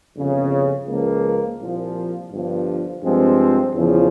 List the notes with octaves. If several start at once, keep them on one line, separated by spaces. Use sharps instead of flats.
G1 F2 C#3
C#2 C#3 F3 A#3
C2 A#2 F3
G1 G2 F3
G2 F3 G#3 C4
E2 C#3 F3